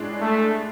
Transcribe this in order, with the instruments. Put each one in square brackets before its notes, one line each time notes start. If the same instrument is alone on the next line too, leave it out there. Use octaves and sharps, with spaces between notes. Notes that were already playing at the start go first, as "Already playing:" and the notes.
Already playing: [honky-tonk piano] A2 G#3 D4 G#4
[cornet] A3